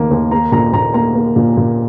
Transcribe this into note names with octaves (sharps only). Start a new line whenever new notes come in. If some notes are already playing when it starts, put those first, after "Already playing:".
Already playing: D#2 D#3 A#3
D#2
A#3 A#5
A#2 A#5
A#2 A#5
A#3 A#5
A#3
A#2
A#2